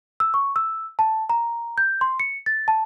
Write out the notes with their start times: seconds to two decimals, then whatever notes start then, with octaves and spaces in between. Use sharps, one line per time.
0.20 E6
0.34 C#6
0.56 E6
0.99 A5
1.30 A#5
1.78 G6
2.01 C6
2.20 C#7
2.46 A6
2.68 A5